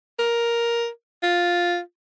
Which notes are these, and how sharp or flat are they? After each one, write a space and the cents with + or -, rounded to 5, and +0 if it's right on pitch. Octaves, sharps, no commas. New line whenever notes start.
A#4 +5
F4 +5